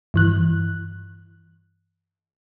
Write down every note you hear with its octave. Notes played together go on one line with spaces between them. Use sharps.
G2 E3 F#6